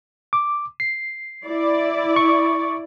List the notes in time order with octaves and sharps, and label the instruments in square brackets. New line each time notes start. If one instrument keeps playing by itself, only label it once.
[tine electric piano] D6
C7
[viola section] E4 D5
[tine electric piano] C#6